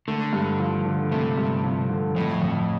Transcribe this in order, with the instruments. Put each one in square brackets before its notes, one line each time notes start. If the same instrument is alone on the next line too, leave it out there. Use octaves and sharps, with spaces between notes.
[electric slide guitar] D3 [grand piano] A3
[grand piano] G2
F3
D3
[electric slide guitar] C3 [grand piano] A3
[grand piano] G2
F3
D3
[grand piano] F2 [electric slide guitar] A2
[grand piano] F2